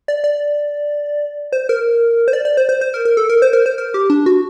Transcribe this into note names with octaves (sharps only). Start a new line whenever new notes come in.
D5
D5
C5
A#4
C5
D5
D5
C5
C5
C5
A#4
A#4
A4
A#4
C5
A#4
C5
A#4
G4
D4
F#4